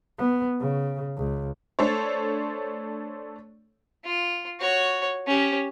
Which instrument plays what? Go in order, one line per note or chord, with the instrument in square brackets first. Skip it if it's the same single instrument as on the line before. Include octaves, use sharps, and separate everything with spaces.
[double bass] B3
C#3
C#2
[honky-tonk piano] A3 D4 A4 C5 C#5
[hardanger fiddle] F4
F#4 C#5
C#4 G4